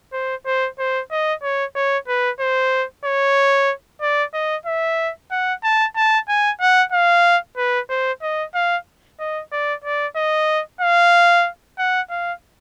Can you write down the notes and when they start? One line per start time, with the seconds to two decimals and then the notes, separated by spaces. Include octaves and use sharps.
0.13 C5
0.46 C5
0.79 C5
1.11 D#5
1.43 C#5
1.75 C#5
2.08 B4
2.40 C5
3.05 C#5
4.01 D5
4.33 D#5
4.66 E5
5.31 F#5
5.63 A5
5.96 A5
6.28 G#5
6.61 F#5
6.92 F5
7.57 B4
7.90 C5
8.22 D#5
8.54 F5
9.19 D#5
9.52 D5
9.84 D5
10.16 D#5
10.81 F5
11.78 F#5
12.10 F5